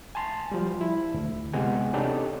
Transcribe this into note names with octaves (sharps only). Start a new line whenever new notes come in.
G#5 A5 C6
F3 G3
E4
D2
C3 G#3 B3 F#5 G#5
C4 D4 D#4 G4 A4 C#5